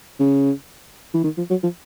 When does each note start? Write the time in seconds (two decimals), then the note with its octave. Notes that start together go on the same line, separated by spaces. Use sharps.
0.20 C#3
1.14 E3
1.24 D#3
1.37 F3
1.50 F#3
1.63 F3